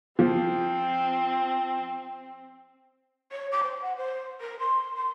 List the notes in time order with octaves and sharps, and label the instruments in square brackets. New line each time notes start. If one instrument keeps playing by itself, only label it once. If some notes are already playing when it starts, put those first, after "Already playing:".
[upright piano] F3 [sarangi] C4
[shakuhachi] C#5
D6
C5
F#5
C5
A#4
C6
C6